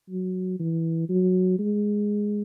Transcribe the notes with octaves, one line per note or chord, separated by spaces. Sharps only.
F#3
E3
F#3
G#3